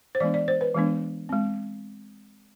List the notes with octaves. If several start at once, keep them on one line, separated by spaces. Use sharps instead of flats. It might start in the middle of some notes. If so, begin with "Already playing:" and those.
C5
E3 G#3 B3 D4 D5
D5
C5
B4
E3 G#3 B3 D4
G#3 C4